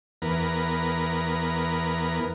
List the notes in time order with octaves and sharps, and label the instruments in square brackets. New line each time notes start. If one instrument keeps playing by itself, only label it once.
[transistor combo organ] E2 B3 A#4